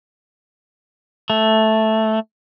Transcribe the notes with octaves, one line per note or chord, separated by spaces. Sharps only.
A3